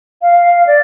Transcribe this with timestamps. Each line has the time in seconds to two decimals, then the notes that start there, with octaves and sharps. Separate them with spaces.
0.22 F5
0.67 D5